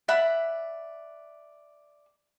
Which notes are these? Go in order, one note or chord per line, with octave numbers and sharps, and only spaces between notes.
D5 E5 F#5 B5